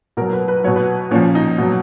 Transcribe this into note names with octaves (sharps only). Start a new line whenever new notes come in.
B2 F#3 A#4
B4
B4
B2 F#3 C#5
B4
A#2 F3 C#4
D#4
B2 F#3